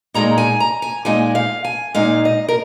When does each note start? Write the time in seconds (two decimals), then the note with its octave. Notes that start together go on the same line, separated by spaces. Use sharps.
0.14 A#2 G#3 D#4 A#5
0.38 G#5
0.60 A#5
0.82 G#5
1.05 A#2 G#3 D#4 G#5
1.35 F5
1.65 G#5
1.94 A#2 G#3 D#4 F5
2.25 D#5
2.48 A#4